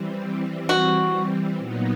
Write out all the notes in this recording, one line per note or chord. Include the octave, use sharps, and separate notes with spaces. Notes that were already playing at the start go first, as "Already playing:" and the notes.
Already playing: E3 G3 C4
F#4
A#2 F#3 B3 D#4